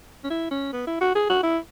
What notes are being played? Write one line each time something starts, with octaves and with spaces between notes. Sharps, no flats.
C#4
E4
C#4
B3
E4
F#4
G#4
F#4
E4